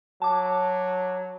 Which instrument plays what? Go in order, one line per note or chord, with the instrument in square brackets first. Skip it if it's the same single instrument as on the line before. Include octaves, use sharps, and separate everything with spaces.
[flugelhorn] F#3 [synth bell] A5 D6